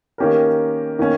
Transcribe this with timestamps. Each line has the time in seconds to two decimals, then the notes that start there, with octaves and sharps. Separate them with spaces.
0.18 D#3 A#3 C#4 G4 A#4
0.99 D#3 A#3 C#4